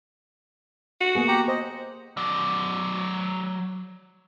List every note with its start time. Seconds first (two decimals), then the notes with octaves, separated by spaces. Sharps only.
1.01 F#4
1.15 A#3 B3 G#4
1.28 G4 A#5
1.48 C5 D#5
2.17 F#3 D5